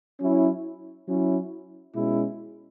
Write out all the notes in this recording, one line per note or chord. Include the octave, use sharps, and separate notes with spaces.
F#3 C#4 E4
F#3 C#4 E4
B2 G#3 C#4 E4